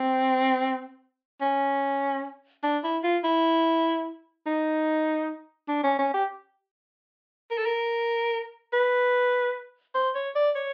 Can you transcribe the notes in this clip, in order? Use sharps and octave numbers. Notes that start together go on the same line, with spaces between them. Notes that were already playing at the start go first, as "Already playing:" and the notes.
Already playing: C4
C#4
D4
E4
F4
E4
D#4
D4
C#4
C#4
G4
A#4
A4
A#4
B4
C5
C#5
D5
C#5